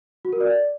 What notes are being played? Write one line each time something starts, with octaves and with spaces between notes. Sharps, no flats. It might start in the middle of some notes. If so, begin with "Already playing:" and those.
F#4
A#4
D5